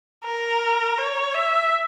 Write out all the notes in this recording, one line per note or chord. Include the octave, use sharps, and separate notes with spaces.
A#4
C#5
E5